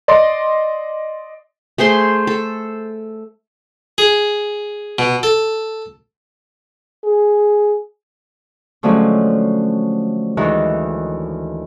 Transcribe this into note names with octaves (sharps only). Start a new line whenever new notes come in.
D5 D#5 C6
A3 G#4 C5 C6
A4
G#4
B2
A4
G#4
D3 F3 F#3 G#3 A3 C#4
D2 D#3 E3 G#3 D#4 F#4